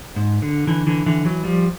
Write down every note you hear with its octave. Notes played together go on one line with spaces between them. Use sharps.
G#2
D3
D3 E3
D3 E3
D3 E3
E3 F#3
F3 G3